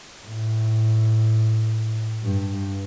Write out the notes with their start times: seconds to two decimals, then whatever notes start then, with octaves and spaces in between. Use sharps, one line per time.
0.25 A2
2.23 G2